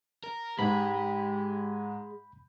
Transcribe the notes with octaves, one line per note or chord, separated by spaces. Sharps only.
A#4
G#2 G#3 G4 B5